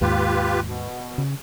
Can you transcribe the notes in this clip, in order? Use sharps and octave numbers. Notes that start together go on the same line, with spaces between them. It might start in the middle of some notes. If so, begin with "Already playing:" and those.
D#2 G#2 F4 G4 B4
B2
C#3